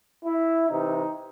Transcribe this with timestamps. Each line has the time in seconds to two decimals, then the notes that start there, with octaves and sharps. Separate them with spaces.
0.24 E4
0.69 C3 E3 D#4